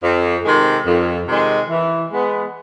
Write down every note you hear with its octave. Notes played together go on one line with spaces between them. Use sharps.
F2
C3 D#3 G#3
F2
C3 D#3 G#3
E3
G#3 B3